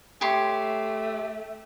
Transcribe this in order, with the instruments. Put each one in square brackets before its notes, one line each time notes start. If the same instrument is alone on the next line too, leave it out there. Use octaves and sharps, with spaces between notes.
[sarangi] A3 [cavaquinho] G4 C#5 C6